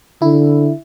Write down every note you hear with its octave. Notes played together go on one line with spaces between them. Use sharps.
D3 E4